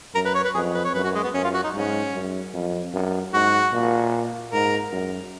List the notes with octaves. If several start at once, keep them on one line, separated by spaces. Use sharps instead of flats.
F#2 A#4
B4
C#5
B4
F2 G#4
B4
C#5
F#2 B4
F#4
G#3
B3
F#2 C#4
F4
F#4
D#4
G#2 C#4
F#2
F2
F#2
G#2 F#4
A#2
G#2 A#4
F#2